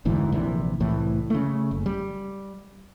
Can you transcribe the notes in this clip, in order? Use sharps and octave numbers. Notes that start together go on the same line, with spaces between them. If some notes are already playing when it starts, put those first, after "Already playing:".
F1 D2 G#2 E3
A#1 C3 E3
C2 A2 E3
C#3 A3
F#1
G3